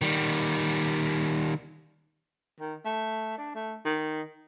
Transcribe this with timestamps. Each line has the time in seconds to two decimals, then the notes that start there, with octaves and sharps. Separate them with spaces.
0.02 D#3 G3
2.60 D#3
2.86 A3
3.38 D4
3.55 A3
3.85 D#3